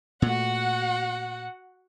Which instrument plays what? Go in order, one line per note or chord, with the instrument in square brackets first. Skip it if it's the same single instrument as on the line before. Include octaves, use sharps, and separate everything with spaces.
[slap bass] A#2 A3 [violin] F#4 F#5